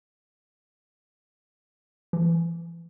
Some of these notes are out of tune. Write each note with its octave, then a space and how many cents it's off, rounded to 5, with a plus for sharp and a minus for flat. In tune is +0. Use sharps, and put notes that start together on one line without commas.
E3 +35